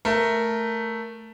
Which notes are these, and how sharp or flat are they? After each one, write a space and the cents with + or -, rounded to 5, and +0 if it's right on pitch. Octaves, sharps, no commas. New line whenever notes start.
A3 +0 A#4 +0